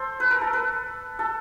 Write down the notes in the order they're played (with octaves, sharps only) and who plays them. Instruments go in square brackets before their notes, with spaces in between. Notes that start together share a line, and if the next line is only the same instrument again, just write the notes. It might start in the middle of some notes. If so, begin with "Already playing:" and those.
Already playing: [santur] A4 C5
B4
A#4
A4
B4
A4